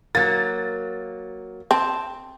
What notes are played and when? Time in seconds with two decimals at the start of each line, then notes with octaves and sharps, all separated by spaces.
0.15 F#3 A#3 A6
1.71 C4 A5